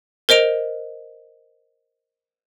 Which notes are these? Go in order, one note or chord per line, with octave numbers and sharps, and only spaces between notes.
A#4 C5 D#5 D7 F7